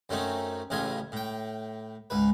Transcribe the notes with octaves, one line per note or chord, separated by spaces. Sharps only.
F#2 F#3 A3 C4 C#4 D#4
A1 A2 C#3 F4 D#5 G#5
A2 G5
C#2 G#2 B4